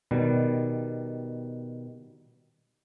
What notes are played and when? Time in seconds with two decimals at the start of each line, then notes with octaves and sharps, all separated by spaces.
0.11 B2 D#3 G3